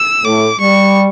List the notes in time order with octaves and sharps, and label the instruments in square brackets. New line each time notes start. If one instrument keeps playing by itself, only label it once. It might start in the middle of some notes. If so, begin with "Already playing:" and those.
Already playing: [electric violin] E6
[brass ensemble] A2 [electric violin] D6
[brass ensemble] G3 [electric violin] C#6